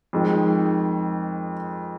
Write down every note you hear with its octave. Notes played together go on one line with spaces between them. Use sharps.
F2 D#3 G#3